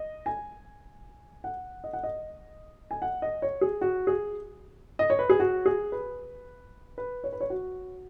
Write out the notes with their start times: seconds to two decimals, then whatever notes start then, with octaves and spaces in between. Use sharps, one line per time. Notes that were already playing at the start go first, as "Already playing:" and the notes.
Already playing: D#5
0.26 G#5
1.44 F#5
1.84 D#5
1.93 F#5
2.03 D#5
2.91 G#5
3.02 F#5
3.22 D#5
3.42 C#5
3.61 G#4
3.81 F#4
4.07 G#4
4.99 D#5
5.10 C#5
5.19 B4
5.30 G#4
5.40 F#4
5.66 G#4
5.92 B4
6.98 B4
7.24 C#5
7.33 B4
7.41 C#5
7.50 F#4